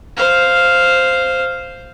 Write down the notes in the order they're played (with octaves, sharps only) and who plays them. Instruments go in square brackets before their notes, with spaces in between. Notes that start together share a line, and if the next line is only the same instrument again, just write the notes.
[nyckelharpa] C5 F5